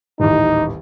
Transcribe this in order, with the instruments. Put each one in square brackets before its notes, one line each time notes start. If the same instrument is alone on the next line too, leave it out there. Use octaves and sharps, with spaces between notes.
[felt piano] D#1 A1 [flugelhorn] D#4